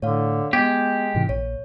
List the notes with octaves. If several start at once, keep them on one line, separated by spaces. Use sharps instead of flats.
A2 D3 C#5 F5
G#3 B3 G4 G6 G#6
G#2 C3 E3
A#1 C#5